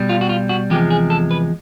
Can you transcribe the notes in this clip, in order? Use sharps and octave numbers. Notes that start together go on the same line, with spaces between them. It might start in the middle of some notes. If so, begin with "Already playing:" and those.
Already playing: B2 G3
F4
F#4
F4
F#4
E2 C3 F3 G#3 G4
G#4
A4
B4